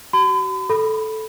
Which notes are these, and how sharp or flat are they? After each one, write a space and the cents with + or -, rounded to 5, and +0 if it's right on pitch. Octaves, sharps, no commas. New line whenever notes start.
F#4 +40 B5 +45
A4 -10 B5 +0